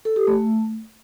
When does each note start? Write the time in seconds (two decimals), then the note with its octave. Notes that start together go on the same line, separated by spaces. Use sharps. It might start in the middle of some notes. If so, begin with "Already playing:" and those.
0.05 A4
0.16 G4
0.27 A3